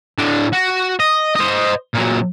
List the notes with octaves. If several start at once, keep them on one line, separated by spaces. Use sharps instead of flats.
A2 D4
F#4
D#5
C5 D#5
A#2 F#3